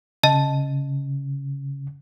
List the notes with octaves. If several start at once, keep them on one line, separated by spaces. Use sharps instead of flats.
C#3 D#5 A5